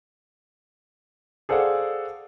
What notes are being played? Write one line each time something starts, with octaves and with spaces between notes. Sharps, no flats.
G#4 A4 C5 D5 F5 F#5